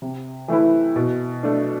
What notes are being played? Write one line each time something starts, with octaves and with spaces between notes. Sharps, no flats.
C3
E3 A3 E4 B4
B2
A3 D4